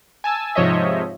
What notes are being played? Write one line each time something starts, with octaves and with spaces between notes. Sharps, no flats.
G#5 A5 E6
G#2 C3 F3 C#5 D#5 E5